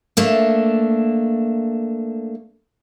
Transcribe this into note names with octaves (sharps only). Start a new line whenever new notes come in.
A3 A#3 D4